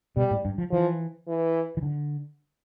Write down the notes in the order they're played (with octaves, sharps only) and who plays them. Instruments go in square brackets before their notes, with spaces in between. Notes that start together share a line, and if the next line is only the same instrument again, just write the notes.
[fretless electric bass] B2 [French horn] G3
[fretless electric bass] A2
G2
F3
[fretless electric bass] E3 [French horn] F3
[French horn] E3
[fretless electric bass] E3
D3